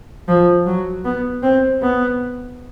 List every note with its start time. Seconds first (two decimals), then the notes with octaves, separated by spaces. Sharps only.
0.28 F3
0.66 F#3
1.05 B3
1.43 C4
1.82 B3